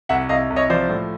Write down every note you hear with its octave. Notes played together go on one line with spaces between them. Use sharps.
C2 E5 F#5
C2 D#5 F5
C2
C#5 D#5
F3 C5 D5
A2